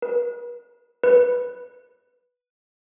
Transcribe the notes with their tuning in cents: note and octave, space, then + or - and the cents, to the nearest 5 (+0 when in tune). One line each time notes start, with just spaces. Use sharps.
B4 -40
B4 -5